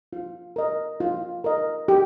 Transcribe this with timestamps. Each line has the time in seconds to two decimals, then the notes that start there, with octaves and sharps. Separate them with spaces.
0.13 F4
0.56 A#4 D#5
1.00 F4
1.44 A#4 D#5
1.88 G4